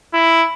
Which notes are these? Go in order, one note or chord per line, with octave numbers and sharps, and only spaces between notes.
E4